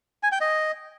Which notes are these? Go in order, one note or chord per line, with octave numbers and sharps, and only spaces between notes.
G#5
G5
D#5